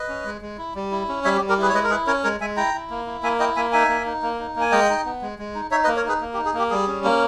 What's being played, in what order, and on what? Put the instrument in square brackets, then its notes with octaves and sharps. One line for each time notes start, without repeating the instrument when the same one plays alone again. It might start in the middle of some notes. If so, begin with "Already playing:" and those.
Already playing: [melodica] B4 D#5
C#4
G#3
G#3
E4
G3
E4
C#4
G3 C#5 E5
G4
G3
G4 A#4
E4 G#4 B4
C#5
G#3 B4 D#5
A#4
E4 G#4 B4
C#4 A#4 C#5
G#3 A#4 C#5
G#3 E5 G#5
E4 G5 A#5
E4
A#3
E4
A#3 E5 G#5
E4 D#5 G5
A#3 E5 G#5
D#4 E5 G#5
A#3
D#4
A#3
D#4
A#3 G#5
G#3 D#5 G5
D#4
B3
G#3
G#3
D#4
D#4 C#5 E5
B4 D#5
A#3
A#4 C#5
D#4 G#4 B4
A#3
G4
D#4
G#4
A#3 G4
G3 G#4
C#4
A#3